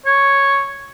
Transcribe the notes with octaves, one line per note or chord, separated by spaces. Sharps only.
C#5